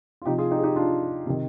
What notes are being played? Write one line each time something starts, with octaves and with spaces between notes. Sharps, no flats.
F4
C3 F3 D#4 G4
F4 G#4
D#4 G4
G#4
D#4 G4
D4 F4
C3 D#3